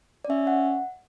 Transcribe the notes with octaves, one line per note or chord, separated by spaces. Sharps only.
D5
C#4 E5
F#5